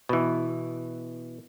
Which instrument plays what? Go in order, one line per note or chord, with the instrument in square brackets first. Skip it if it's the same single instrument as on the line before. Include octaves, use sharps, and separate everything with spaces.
[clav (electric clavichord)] B2 E3